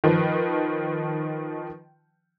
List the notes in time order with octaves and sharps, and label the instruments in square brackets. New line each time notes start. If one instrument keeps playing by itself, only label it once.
[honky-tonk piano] D#3 F3 B4